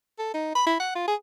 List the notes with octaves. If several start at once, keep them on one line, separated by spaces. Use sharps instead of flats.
A4
D#4
B5
E4
F#5
F4
G#4